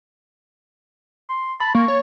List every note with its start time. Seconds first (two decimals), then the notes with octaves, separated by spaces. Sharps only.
1.29 C6
1.60 A5 B5
1.75 A#3 C#6
1.88 C#5